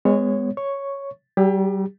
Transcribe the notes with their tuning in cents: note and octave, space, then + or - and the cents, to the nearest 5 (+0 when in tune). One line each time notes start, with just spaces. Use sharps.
G#3 -20 B3 +25 C#5 +0
C#5 +0 C#6 +0
G3 -35 G4 +35